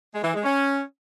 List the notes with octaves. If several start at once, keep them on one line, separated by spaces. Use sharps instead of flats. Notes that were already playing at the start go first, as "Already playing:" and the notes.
G#3
E3
G#3
C#4